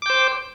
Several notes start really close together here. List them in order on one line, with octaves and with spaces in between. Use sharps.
D6 G5 C5